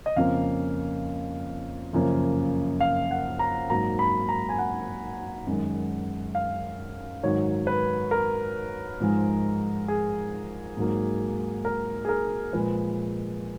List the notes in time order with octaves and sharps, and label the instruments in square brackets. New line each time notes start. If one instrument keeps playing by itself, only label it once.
[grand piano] D#5
F2 C#3 F3 A#3 F5
F#2 C#3 F3 A#3
F5
F#5
A#5
G#2 F#3 A#3 A#5
B5
A#5
G#5
F#5
F#2 D#3 G#3
F5
G#2 D#3 F#3 C#5
B4
A#4
G#2 F3 G#3
G#4
G#2 F#3 A#3
A#4
G#4
A#4
A#2 F3 G#3 B4